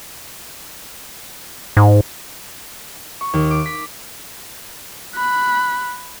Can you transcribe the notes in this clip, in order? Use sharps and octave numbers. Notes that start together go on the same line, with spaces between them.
G#2
C#6
D#2
D6
B6
B5 F#6